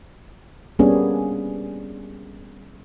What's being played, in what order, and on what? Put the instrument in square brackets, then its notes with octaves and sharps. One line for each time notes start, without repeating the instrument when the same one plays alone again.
[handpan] G3 A#3 B3 C#4 D4 G#4